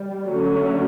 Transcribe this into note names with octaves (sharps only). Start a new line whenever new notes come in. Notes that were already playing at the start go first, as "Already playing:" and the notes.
Already playing: G3
D3 F#3 A3 C#4